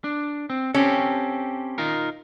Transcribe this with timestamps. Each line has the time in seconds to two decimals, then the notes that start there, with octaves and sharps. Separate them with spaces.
0.04 D4
0.50 C4
0.74 C4 C#4 G4 A4
1.78 D#4 F4 A#4